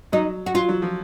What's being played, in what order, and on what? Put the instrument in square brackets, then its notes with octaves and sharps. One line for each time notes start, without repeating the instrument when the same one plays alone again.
[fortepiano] F#3 [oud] D#4
[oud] F#4
[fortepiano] F#3 [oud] F4
[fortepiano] F#3
F3